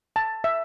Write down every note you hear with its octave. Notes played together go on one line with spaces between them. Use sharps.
A5
E5